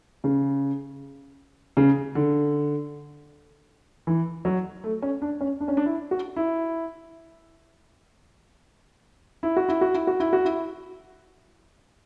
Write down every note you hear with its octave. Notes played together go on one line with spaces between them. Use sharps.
C#3
C#3
D3
E3
F#3
A3
C#4
D4
C#4
D4
C#4
D4
E4
F#4
E4
E4
F#4
E4
F#4
E4
F#4
E4
F#4
E4